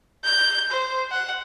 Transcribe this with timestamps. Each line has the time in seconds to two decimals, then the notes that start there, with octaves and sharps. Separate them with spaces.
0.25 G6
0.71 C5
1.11 F#5